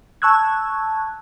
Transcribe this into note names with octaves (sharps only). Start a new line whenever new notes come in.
A5 C#6 E6 F#6 G#6